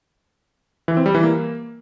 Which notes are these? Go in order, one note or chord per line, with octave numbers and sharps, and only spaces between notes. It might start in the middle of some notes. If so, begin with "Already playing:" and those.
E3
C4
G3
E3
A#3